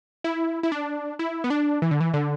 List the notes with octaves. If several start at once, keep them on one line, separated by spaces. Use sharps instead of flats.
E4
E4
D4
E4
B3
D4
E3
D3
E3
D3